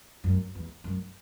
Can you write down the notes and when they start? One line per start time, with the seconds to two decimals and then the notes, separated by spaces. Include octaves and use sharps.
0.24 F#2
0.55 E2
0.84 F#2